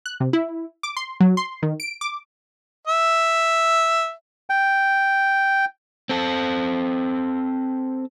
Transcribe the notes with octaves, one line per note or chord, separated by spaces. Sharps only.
F#6
C3
E4
D6
C6
F#3
C6
D#3
D7
D6
E5
G5
C4 A4